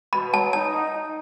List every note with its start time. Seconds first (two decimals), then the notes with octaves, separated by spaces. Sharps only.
0.13 B2 B5
0.33 F#3 A5
0.53 D#4 A5
0.74 D#4
0.94 D#4